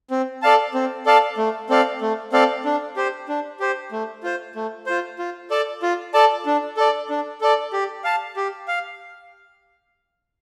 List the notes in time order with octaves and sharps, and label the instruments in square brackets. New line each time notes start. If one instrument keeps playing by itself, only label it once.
[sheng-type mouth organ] C4
A4 D5 F5 A5
C4
A4 D5 F5 A5
A3
C4 A4 D5 F5
A3
C4 A4 D5 F5
D4
G4 C5
D4
G4 C5
A3
F4 C5
A3
F4 C5
F4
A4 D5 A5
F4
A4 D5 A5
D4
A4 D5
D4
A4 D5
G4
F5 A5
G4
F5